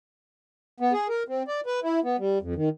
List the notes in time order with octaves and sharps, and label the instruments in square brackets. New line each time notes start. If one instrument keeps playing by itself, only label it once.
[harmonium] B3
G#4
A#4
C4
D5
B4
E4
B3
G3
F2
D#3